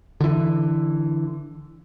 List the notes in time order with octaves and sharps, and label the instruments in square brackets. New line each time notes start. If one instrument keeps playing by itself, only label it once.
[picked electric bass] D3 E3